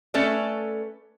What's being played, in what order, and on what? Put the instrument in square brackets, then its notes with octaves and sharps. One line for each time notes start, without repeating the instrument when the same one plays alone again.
[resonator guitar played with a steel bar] A3 C#4 A4 B4 D5